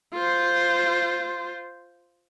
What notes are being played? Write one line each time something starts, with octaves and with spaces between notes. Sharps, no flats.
F4 C5